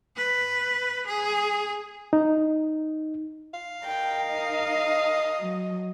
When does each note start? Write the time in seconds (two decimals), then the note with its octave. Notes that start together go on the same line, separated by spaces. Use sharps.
0.17 B4
1.07 G#4
2.13 D#4
3.54 F5
3.85 D#4 A#4 G5
4.31 D#5
5.40 F#3